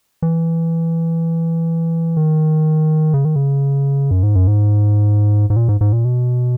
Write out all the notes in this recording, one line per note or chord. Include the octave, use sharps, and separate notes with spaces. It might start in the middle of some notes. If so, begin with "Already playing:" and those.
E3
D#3
C#3
D#3
C#3
F#2
G#2
F#2
G#2
G#2
A#2
G#2
G#2
A#2
B2